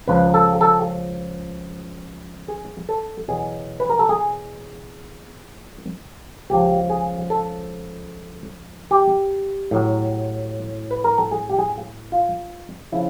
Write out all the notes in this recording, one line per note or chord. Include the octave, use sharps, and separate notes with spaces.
C#2 C#3 F3 B4
A4
A4
G#4
A4
E2 B2 F#3 G#4
B4
A#4
A4
G#4
C#2 C#3 F3 G4
G#4
A4
G4
A2 F#3
B4
A#4
A4
G#4
G4
G#4
F4
C#3 F3 E4